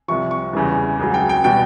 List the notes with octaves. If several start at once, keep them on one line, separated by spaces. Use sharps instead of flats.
C2 C3 F3 C#6
C#6
E2 C#3 E3 G3
C#2 C#3 F#3
G5
G5
B2 G3 G5